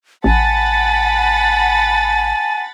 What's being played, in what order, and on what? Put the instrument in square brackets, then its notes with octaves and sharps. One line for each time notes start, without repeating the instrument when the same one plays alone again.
[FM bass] A1 [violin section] F#5 B5 A6 [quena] G#5 [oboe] A5